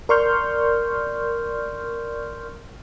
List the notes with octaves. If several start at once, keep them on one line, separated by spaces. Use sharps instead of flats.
A#4 D5 C6 C#6 F6 G6